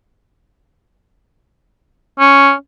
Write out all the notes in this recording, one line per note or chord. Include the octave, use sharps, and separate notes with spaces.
C#4